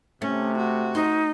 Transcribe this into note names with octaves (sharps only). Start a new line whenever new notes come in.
C3 A3 C#4
F#4
D#4 C5